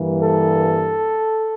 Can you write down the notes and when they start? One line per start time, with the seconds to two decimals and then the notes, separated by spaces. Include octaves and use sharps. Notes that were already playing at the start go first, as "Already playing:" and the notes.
Already playing: G2 E3 G3 A#3
0.21 A4